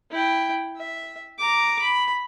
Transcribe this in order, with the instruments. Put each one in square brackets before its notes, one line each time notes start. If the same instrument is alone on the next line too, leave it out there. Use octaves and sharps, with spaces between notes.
[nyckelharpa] E4 G5
E5
A#5 D6
B5